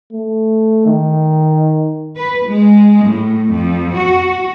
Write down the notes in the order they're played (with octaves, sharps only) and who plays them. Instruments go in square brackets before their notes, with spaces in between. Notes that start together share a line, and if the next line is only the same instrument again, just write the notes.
[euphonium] A3
D#3
[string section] B4
G#3
A2
F2
F#4